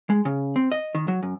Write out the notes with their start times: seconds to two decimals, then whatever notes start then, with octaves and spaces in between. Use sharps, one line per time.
0.10 G#3
0.25 C#3
0.56 C4
0.72 D#5
0.95 D#3
1.08 F#3
1.23 F#2